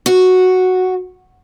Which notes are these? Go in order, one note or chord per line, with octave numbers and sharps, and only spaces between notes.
F#4